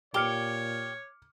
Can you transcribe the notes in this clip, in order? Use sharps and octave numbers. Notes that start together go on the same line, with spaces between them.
A#2 G4 C#5 D6 F6 C#7